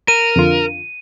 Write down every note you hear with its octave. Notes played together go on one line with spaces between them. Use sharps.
A#4 D#7
F2 D3 F4